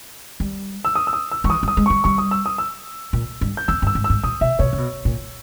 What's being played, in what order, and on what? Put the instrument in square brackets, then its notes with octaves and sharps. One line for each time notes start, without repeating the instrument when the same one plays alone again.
[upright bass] G3
[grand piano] E6
D#6
E6
D#6
E6
[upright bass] G3 [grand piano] C#6
[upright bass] E3 [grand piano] D#6
[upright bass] G3
[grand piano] D#6
[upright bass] G#3
[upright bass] G3 [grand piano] C#6
[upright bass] G3 [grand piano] C#6
[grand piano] D#6
E6
D#6
E6
[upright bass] A#2
G2
[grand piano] G6
[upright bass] E2 [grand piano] E6
[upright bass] G2
[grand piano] E6
[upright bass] G#2
[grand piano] E6
[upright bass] G#2
[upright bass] A#2 [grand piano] D#6
[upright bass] B2 [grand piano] E5
[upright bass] B2 [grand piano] C#5
[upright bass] C#3
B2
A#2